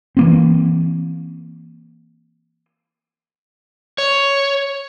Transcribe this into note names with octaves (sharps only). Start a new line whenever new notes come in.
E3 A#3 C4
C#5